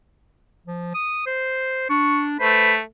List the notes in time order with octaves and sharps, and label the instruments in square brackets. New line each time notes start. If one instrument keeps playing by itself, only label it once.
[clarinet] F3
D#6
C5
[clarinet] D4 [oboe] C#6
[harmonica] A3 [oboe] B4 [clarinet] C5